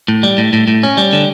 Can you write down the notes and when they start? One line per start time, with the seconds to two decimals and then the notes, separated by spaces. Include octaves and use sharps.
0.08 A2
0.23 G3
0.38 A2
0.53 A2
0.68 A2
0.83 C#4
0.97 G3
1.13 D3